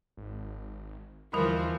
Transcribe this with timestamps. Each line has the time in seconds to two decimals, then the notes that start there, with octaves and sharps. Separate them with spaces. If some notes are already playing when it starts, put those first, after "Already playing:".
0.17 G#1
1.33 D#2 D3 E3 F3 G3 A#4